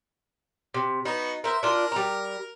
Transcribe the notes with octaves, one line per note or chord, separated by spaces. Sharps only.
C3
B3 D#4 F#4
A#4 C5 E5
D4 F4 A#4
G3 A#5